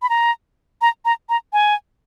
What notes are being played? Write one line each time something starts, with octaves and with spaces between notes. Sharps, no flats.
B5
A#5
A#5
A#5
A#5
G#5